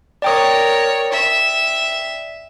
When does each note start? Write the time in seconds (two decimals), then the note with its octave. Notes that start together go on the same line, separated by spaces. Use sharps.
0.22 A#4 C#5 D5 G5 D#6
1.12 E5